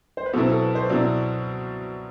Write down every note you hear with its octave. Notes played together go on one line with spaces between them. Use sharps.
C5
B4
B2 F#3 C4 E4 A4
A4
B4
C5
B2 F#3 C4 E4 D5